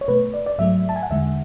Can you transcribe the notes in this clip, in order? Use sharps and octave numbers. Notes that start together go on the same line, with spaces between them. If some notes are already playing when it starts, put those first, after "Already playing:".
C#5
B2 A3 B4
D5
D5
G#2 F#3 A3 E5
A5
G#5
F#5
E2 D3 G#3 E5